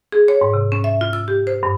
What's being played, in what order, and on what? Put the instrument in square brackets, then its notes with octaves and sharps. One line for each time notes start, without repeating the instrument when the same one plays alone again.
[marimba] G#4
C#5
G#2
C3
C#4
E5
F4
E6
G4
C5
G2